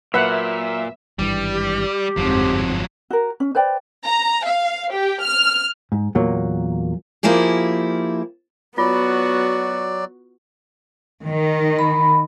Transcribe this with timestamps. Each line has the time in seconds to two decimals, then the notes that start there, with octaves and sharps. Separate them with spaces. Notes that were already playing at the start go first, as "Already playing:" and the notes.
0.14 A#2 F#3 A#3 B4 E5 F#5
1.19 G#1 G2 E3 G3
1.52 G4
2.17 G1 F2 G#2 F3 F#3 C4
3.10 F#4 A#4
3.40 C#4
3.55 B4 C5 D5 G5
4.05 A#5
4.44 F5
4.92 G4
5.20 F6
5.92 G#2
6.15 E2 A#2 F#3 A#3
7.23 F3 A#3 E4 G4 G#4
8.78 F#3 B3 F4 F#4 D5
11.25 D#3
11.79 B5